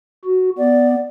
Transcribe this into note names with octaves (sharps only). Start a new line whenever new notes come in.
F#4
B3 D5